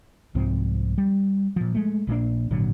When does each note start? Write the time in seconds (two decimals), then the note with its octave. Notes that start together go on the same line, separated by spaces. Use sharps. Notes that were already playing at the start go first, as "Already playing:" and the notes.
0.35 C2 G#2 F3 C4
0.98 G3
1.56 A#2 F3
1.75 G#3 A3
2.07 A#1 A#2 A#3 D4
2.51 G#1 A#2 D3 F#3